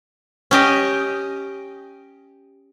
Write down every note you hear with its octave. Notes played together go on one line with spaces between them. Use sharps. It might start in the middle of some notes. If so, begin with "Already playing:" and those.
C#4 G4 D#5